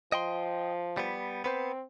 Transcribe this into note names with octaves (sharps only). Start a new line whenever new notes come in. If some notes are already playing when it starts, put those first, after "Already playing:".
F3 D#5 G5 C6
G3 B3
B3 C4 B4 C5